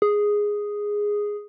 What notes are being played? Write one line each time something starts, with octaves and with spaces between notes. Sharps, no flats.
G#4